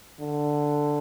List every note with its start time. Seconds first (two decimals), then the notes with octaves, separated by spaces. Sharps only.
0.20 D3